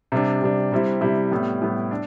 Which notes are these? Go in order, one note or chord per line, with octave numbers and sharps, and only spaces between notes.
C3 G3 D4
C3 G3 D4
C3 G3 C4 E4
C3 G3 C4 E4
A2 G3 B3
A2 G3 B3
D4